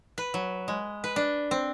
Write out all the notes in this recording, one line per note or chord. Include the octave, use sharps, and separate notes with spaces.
B4
F#3
G#3
B4
D4
C4